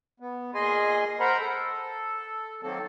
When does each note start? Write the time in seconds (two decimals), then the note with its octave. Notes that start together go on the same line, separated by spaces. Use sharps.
0.20 B3
0.55 A#2 G#4 D#5 G#5 C6
1.20 A#4 C5 F#5 A#5 B5
1.40 A4
2.63 D#3 F#3 A#3 C4 A4